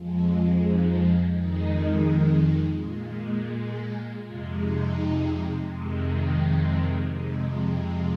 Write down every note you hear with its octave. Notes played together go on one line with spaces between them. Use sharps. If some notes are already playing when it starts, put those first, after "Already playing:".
Already playing: F2 F3 G#3
D#4
F2 D#3 G#3 D#4
A#2 G#3 F4
G#4
F2 C3 G#3 F4
D#4
F2 C3 D#3 G#3
D#4
C4
F2 C3 G#3 D#4
F4
F4